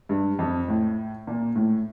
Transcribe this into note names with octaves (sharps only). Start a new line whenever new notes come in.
G2
F2
A2
A#2
A2